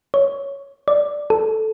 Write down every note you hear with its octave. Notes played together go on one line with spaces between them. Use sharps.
C#5
D5
A4